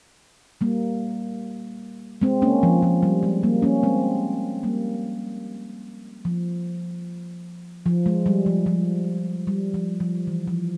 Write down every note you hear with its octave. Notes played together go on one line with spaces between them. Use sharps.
G3 A#3
G#3 C4
A#3 C#4
F3
F3
G3
G#3
G3 A#3
A#3 C#4
G#3 C4
G3 A#3
F3
F3
G#3
G3
F3
F3
G3
F3
F3
E3
F3